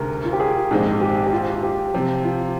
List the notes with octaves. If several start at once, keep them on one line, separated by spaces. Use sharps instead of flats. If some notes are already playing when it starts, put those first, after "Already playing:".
Already playing: D2 C3 D#3 G#3 A#4
F4
G4
G#4
A#1 G#2 D#3 G#3 C4
G4
G4
F4
G4
C3 F3 C4
F4